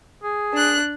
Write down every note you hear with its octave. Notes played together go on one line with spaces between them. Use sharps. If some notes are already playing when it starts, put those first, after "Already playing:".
G#4
D4 F#6